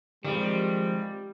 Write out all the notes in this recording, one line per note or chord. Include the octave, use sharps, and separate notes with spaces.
D#3 F3 G3 G#3 C4 G4